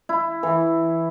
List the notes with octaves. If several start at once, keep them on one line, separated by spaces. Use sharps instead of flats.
E4
E3